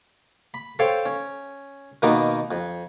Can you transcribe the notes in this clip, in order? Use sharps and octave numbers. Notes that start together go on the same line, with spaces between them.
B5
A4 C5 C#5 F5 G5
C#4
B2 D#3 A#3 B3
F2